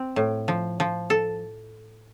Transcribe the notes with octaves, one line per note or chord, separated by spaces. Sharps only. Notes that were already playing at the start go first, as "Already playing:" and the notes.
Already playing: C4
A2
F3
F3
A4